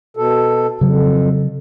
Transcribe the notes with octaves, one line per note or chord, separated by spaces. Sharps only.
B2 A4
F2 C#3 F#3